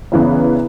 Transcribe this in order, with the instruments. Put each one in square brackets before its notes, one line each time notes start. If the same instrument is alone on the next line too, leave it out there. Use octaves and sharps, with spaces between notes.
[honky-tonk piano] E2 C#3 E3 B3